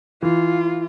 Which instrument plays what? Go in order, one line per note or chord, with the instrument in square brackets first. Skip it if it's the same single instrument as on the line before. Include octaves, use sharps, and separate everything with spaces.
[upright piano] E3 [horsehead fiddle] F4